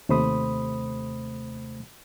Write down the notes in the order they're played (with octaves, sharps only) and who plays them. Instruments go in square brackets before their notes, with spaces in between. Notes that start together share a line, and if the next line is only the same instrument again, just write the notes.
[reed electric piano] D#2 C3 A3 C5 B5 D#6